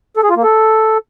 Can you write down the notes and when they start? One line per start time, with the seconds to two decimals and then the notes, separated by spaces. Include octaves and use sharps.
0.17 A4
0.23 G#4
0.30 F4
0.37 A#3
0.43 A4